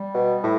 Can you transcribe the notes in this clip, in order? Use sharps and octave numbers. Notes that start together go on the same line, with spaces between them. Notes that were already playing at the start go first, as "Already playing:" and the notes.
Already playing: G3
B2
A2